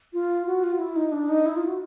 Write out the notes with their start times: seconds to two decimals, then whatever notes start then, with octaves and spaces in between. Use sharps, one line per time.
0.13 F4
0.47 F#4
0.64 F4
0.79 E4
0.96 D#4
1.12 D4
1.29 D#4
1.46 E4
1.56 F4
1.67 F#4